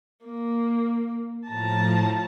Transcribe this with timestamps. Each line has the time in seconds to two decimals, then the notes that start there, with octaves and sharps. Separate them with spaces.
0.25 A#3
1.47 A2 F3 A5 A#5